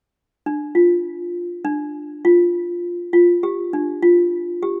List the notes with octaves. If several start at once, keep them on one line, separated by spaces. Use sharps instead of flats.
D4
F4
D4
F4
F4
G4
D4
F4
G4